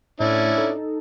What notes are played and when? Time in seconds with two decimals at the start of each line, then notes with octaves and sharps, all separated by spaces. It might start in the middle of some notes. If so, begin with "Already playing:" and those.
0.20 A2 C#4 D4 E4
0.58 D#4 A4